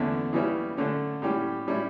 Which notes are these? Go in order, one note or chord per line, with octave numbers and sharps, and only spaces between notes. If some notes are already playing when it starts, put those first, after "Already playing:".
Already playing: E2 D3 A3 C#4 E4
C#3 E3 G3 C#4 E4
D3 A3 C#4
A2 G3 C#4 G4
A2 G3 C#4 E4